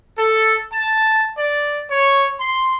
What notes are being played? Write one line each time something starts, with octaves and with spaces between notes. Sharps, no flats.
A4
A5
D5
C#5
C6